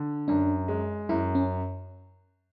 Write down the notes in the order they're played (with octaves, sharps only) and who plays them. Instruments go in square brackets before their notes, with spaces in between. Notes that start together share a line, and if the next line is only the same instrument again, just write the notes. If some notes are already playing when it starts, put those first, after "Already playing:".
Already playing: [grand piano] D3
[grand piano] F#2 [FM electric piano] D4
[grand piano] G#3
[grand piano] F#2 [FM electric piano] E4
[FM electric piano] C#4